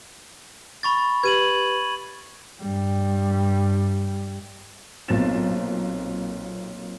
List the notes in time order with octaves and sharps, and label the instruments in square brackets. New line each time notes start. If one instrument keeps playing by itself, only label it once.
[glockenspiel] B5 C#6 A6
[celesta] G4 B4 [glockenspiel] G#6 D#7 F#7
[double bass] G2 G3
[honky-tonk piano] B1 A#2 C4 A6 E7